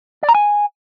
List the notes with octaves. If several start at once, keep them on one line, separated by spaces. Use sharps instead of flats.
D5
A#5
G#5